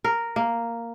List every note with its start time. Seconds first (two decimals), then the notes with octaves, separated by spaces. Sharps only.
0.04 A#4
0.36 A#3